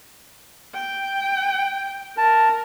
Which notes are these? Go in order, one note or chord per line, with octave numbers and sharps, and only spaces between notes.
G5
A#4 A5